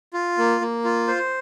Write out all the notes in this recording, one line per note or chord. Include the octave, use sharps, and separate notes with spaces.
F4
A#3
A#3
F4
C5